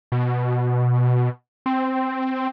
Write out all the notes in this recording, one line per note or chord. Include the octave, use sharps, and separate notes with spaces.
B2
C4